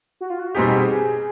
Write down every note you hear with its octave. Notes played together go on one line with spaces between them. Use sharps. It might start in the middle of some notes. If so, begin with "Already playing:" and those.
F#4
F4
F#4
B2 G3 C4 D#4 G4 G#4